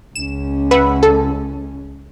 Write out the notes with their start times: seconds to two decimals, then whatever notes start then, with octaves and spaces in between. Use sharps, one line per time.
0.15 C#2 C#4 E7
0.71 B4 E5 F#5
1.03 A4